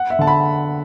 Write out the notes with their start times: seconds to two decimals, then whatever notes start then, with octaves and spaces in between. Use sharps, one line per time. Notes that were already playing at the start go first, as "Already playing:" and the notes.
Already playing: F#5
0.10 E5
0.19 D3 A5
0.27 B5